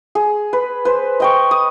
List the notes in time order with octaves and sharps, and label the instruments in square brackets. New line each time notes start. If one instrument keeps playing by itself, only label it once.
[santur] G#4
B4
B4 C5
D#5 G5 C#6
D#6